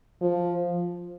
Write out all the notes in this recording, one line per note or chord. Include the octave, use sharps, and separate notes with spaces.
F3